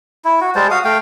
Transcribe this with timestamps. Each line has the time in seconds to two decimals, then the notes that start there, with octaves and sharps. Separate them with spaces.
0.25 E4
0.41 F#4
0.55 G3 G#3 C5 A5
0.71 F#4 F5 D#6
0.84 A3 F5 G5